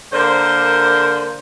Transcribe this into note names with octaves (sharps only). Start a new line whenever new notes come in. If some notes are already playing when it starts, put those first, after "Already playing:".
D3 A#3 A#4 C5